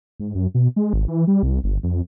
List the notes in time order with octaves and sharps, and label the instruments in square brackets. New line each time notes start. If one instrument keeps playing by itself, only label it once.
[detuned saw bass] G#2
F#2
B2
G#3
G#1
E3
G3
C2
G1
F2